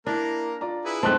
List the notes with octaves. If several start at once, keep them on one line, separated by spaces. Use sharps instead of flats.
A#3 D4 E4 A#4
F4 D5 A#5
E4 G#4 B4
F#2 D#3 G#3 A3 C4 A5 F#6